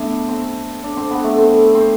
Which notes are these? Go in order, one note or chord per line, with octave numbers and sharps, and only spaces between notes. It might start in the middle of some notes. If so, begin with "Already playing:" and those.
Already playing: A3 B3 D4
C4
D4
C4
B3
A3
C4
C4